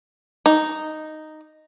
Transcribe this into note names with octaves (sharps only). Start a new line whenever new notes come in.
D#4